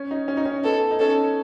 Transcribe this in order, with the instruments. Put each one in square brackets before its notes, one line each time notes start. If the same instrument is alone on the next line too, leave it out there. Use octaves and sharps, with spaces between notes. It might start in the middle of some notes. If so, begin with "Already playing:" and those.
Already playing: [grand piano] C#4
D#4
C#4
D#4
C#4
[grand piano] B3 [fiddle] A4
[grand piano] D#4
[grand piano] C#4 [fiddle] A4